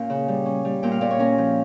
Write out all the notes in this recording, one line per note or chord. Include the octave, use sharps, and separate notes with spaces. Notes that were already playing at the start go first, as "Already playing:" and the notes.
Already playing: A#2 C#4 F5 G5
C#3
G3
C#4
G3
A#2 G5
F5
A#2 D5
C#5
C#4 A#4
F3